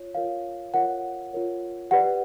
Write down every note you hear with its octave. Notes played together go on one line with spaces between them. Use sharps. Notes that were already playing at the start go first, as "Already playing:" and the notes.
Already playing: F4 C#5
F4 A#4 C#5 F5
F4 A#4 C#5 F#5
F4 A#4 C#5
G4 B4 D5 F#5